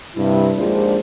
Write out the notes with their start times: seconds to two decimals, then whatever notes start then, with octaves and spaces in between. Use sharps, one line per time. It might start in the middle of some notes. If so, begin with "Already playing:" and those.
0.16 G2 C3 E4
0.57 A#1 D#2 G#3 D4 F4 C5